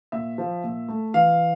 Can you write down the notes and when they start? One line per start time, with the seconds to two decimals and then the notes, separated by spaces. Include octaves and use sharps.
0.12 A#2 E5
0.38 F3
0.64 A#2
0.88 A3
1.14 E3 F5